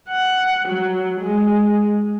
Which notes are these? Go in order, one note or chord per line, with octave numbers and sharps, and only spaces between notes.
F#5
F#3
G#3